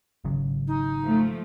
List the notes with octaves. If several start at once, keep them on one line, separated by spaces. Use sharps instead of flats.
G#1 C#3 F#3
D#4
F3 A3